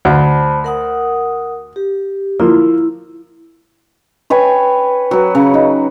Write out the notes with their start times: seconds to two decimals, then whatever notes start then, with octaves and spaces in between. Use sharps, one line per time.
0.05 D2 C5 A5 B5
0.64 A#4 F#5 D#6
1.76 G4
2.40 F3 A#3 E4
4.30 B4 C#5 G5 G#5
5.11 F#3 B4
5.35 C#3
5.54 D#4